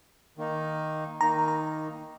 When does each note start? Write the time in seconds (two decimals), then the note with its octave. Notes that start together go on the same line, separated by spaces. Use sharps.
0.37 D#3 A#3 D#4
1.21 D#3 A#3 D#4 A#5
1.48 A#5